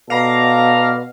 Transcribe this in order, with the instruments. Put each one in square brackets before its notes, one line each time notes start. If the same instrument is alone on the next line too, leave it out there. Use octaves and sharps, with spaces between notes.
[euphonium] B2 [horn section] A4 D5 A#5 [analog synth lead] F5